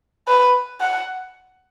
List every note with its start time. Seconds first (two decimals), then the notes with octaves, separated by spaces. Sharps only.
0.28 B4
0.81 F#5